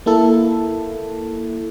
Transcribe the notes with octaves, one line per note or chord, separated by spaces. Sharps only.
A#3 E4 A4